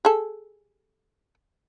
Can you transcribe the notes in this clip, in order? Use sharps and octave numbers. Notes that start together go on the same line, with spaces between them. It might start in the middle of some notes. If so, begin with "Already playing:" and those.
G#4 A4